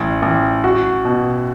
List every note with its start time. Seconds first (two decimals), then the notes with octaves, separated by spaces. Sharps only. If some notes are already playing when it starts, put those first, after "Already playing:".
Already playing: A1
0.22 A1
0.64 F#4
1.05 B2